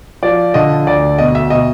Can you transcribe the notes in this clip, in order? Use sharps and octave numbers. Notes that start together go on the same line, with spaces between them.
F3 D5
D3 D#5
D2 D5
B2 D#5
E5
B2 D#5